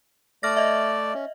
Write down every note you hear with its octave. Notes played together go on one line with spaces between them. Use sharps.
A3 D5 F6 A#6
D#5 E5
C#4